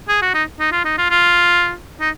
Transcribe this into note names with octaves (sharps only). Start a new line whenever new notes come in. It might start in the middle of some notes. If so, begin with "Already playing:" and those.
G#4
F#4
D#4
D#4
F4
D#4
F4
F4
D#4